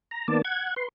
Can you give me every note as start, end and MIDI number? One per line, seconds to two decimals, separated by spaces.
0.11 0.27 82
0.28 0.42 51
0.28 0.42 58
0.28 0.42 59
0.28 0.42 74
0.28 0.42 81
0.45 0.74 78
0.45 0.74 92
0.76 0.88 71
0.76 0.88 84